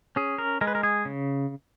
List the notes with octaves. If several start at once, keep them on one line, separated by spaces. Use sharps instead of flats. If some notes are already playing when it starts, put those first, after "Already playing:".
C#4 G#4
A#4
G#3 A#4
B4
A#4
G#4
C#3